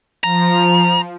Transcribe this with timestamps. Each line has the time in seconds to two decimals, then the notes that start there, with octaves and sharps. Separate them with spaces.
0.24 F3 A#5